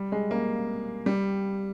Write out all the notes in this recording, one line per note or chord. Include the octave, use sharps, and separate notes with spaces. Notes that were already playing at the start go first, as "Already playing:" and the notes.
Already playing: G3
G#3
A#3
G3